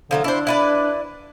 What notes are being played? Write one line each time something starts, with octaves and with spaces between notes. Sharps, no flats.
D3 F3 F#3 A3
D4 E4 C5
E4 B4 D5